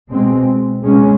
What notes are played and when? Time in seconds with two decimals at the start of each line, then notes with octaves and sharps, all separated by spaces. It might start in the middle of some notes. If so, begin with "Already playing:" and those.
0.11 B2 G#3 C4
0.82 B2 G#3 C#4